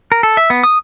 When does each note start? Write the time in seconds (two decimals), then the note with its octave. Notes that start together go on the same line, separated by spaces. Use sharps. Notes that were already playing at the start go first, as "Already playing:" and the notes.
0.12 A#4
0.23 A4
0.37 E5
0.50 B3
0.64 D#6